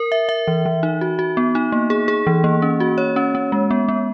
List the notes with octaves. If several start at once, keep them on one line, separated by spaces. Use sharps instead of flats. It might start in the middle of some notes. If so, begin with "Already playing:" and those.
Already playing: A#4
E5
E5
E3
E3
D#4
F#4
F#4
B3
D#4
A#3
G#4
G#4
E3
A#3
C#4
F#4
C#5
C#4
C#4
G#3
B3
B3